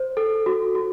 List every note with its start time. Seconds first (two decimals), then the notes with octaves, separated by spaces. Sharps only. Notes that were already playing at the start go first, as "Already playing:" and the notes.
Already playing: C5
0.17 A4
0.46 F#4
0.75 F#4